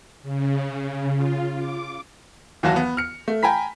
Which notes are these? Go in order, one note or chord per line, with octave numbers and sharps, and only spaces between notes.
C#3
F4
D6
D#2 E3 F#3 F#4 A5
B3
F6 C#7
A3
G5 G#5 A#5 B5 B6